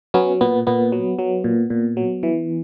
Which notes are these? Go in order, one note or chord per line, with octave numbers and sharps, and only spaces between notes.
F#3 B3 C#4
A#2 B3
A#2 B3
F#3
F#3
A#2
A#2
F#3
E3